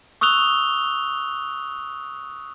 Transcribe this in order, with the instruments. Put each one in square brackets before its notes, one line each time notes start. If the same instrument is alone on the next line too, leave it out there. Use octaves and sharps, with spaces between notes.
[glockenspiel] C#6 D#6 E6 F#6 F7 G7